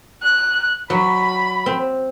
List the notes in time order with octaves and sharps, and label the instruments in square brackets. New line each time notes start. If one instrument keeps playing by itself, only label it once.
[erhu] F#6
[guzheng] F#3 [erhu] B5
[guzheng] C4